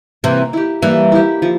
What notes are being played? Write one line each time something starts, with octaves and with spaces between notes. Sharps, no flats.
C3 E3 A#3
E4 G4
E3 G3 A#3
E4 G4
F3